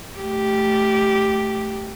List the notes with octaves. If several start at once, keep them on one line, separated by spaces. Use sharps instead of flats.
A3 G4